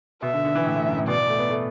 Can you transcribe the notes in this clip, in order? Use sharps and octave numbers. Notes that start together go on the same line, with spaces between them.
B2 E5
D3
D3
E3
A2
A2
F#2
A2
B2 D5
E3
A3
B3
A3